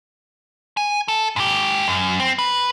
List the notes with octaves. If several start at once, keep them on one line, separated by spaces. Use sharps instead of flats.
G#5
A4
G#2 G4
F#2
C4
B4